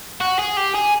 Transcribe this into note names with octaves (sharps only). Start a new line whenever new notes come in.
F#4
G#4
G4
G#4